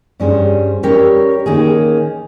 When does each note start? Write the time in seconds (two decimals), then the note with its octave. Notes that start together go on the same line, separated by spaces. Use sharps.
0.20 G2 G3 C#4 G#4 C5
0.83 G3 C#4 G4 A#4 C#5
1.46 D#3 A#3 C#4 G#4